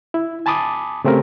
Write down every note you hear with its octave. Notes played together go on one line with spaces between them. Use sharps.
E4
G#5 A5 B5 D6 D#6
C#3 A3 C4 G4 A#4